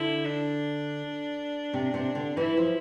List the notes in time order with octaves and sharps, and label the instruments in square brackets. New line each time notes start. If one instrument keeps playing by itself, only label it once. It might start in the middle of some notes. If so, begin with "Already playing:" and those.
Already playing: [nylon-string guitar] D3 [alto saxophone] E4
[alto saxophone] D4
[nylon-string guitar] C3
C3
D3
[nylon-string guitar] E3 [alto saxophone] E4
[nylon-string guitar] F3